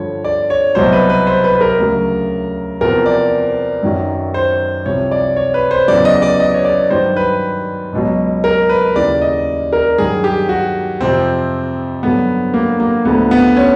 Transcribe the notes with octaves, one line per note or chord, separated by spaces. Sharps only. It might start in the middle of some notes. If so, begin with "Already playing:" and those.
Already playing: G2 D3 F3 C#5
D5
C#5
C2 B2 F#3 C5
B4
B4
C5
B4
B4
A#4
D2 C#3 F#3
E2 C3 F3 A#4
D5
F#2 D#3 F#3
C5
C2 C3 F3 C#5
D5
C#5
B4
C5
E2 C#3 F#3 D5
D#5
D5
D#5
C#5
D5
G2 D#3 F#3 C5
B4
C#2 B2 F#3
A#4
B4
D#2 C#3 E3 D5
D#5
A#4
G2 D#3 F#3 G#4
G4
F#4
F2 C3 F3 C4
G2 D3 F#3 B3
A#3
A#3
D2 D3 F3 B3
B3
C#4